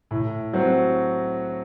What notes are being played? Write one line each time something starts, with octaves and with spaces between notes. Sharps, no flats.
A2
F#3 C4 F#4